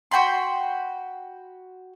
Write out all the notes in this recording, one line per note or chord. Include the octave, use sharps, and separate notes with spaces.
F#4 G5 B5 C6